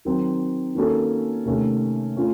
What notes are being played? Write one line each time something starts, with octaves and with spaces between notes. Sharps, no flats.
D#3 F#3 C4
D#3 A#3 C#4 F#4 A4
C3 D#3 A3 C#4
A3 C#4 F4